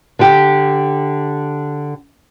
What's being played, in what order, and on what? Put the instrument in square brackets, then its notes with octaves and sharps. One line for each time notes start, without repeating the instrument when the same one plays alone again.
[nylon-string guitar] D3 G4